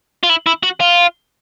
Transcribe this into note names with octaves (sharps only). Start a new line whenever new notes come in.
F4
E4
E4
F#4
F4